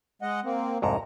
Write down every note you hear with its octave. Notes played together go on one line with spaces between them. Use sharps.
G#3 D#5 F#5
A#3 C4
C2 F2 G#2 A#5